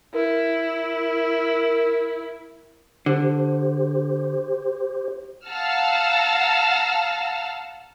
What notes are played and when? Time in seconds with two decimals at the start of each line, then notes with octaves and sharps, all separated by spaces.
0.14 E4 A#4
3.06 D3 G4 C5
5.46 F5 F#5 A5 A#5 E6 F6